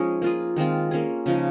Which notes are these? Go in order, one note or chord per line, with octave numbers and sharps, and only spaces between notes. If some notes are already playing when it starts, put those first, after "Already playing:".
Already playing: F3 G#3 C#4 D#4 G#4
A#3 F4 G#4
D#3 G#3 C4 F4
A#3 C#4 G#4
C#3 F3 G#3 D#4